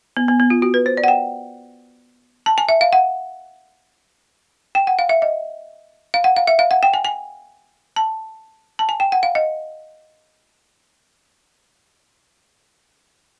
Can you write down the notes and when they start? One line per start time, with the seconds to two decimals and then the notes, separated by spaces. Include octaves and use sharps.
0.17 B3
0.28 B3
0.40 B3
0.50 F4
0.62 F#4
0.74 B4
0.86 C5
0.97 D5
1.04 F#5
1.08 G5
2.46 A5
2.58 G#5
2.69 E5
2.81 F5
2.93 F#5
4.75 G5
4.87 F#5
4.99 F5
5.09 E5
5.22 D#5
6.14 F5
6.24 F#5
6.37 F5
6.47 E5
6.59 F5
6.71 F#5
6.83 G5
6.94 G#5
7.05 G#5
7.96 A5
8.79 A5
8.89 G#5
9.00 G5
9.12 F#5
9.23 F5
9.35 D#5